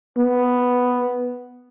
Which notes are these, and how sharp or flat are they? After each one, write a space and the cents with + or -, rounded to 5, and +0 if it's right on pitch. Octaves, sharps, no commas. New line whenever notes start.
B3 +0